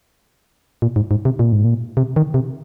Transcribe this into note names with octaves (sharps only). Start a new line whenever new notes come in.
A#2
G#2
G#2
C3
A#2
G#2
A#2
C3
D#3
C3